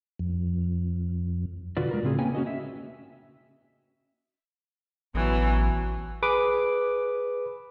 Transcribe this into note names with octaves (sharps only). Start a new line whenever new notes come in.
F2
B2 D3 F4 F#4 B4 D5
G#3 A#4
A2 C#3 C4 G#4
A#3 C#4 B4 C#5 G5 G#5
C#4 F#4 D#5
E5
A1 B2 E3 F#3
G#4 B4 D6